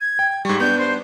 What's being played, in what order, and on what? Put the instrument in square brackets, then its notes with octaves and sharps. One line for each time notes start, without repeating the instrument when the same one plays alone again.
[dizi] G#6
[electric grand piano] G5
[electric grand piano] G#2 G3 [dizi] C#6
[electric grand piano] B3 D4 [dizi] G6
[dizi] C5